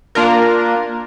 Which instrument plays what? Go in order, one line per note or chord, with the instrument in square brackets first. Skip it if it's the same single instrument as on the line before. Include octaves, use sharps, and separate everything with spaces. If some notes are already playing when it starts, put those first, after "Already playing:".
[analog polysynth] A#3 D4 F4 A#4